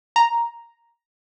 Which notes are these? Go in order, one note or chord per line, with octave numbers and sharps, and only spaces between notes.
A#5